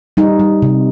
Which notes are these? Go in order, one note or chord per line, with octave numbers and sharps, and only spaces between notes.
G3 D#4
G3
C3